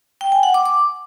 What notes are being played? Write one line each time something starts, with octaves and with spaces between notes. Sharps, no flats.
G5
G#5
F#5
D6
D6